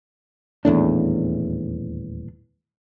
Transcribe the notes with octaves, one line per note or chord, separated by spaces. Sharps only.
D#1 E2 A2 D4